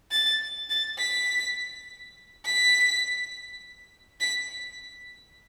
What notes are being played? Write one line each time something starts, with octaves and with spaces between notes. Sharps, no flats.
A6
A6
B6
B6
B6